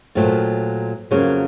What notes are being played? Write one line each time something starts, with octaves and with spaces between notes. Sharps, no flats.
A#2 F#3 A3 C4 F4
F2 C#3 F#3 A#3